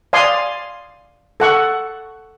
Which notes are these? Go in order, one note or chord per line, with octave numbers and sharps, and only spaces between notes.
D5 F5 G#5 C6 D#6
A4 F#5 C#6